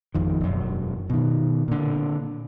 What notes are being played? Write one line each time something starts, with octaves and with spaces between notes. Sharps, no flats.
G#1 F2 D#3
E1 F#2
B2 D#3
A#2 D3